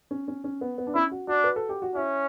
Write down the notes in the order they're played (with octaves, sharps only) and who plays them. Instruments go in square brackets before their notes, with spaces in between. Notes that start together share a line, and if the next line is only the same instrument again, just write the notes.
[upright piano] C#4
C#4
C#4
B3
B3
D4
[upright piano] C#4 [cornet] E4
[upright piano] F#4
[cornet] D4 [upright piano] F#4
[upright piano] B4
A4
G4
F#4
[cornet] C#4 [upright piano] E4